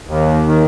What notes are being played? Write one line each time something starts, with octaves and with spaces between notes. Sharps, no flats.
D#2
D#3